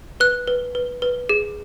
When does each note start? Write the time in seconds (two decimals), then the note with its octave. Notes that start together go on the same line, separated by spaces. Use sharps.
0.20 B4 F#6
0.48 B4
0.75 B4
1.02 B4
1.29 G#4